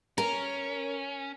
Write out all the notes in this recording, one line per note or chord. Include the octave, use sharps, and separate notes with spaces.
C#4 A#4